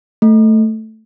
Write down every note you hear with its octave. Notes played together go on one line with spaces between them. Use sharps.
A3